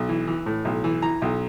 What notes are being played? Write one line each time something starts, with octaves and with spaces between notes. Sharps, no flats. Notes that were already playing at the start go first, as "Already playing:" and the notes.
Already playing: B1
E3
E3
A2
B1
E3
E3 A#5
B1